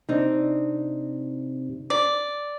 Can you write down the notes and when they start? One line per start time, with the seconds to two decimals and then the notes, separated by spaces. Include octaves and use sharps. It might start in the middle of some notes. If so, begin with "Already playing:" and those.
0.09 C3 C4 D4 D#4
1.90 D5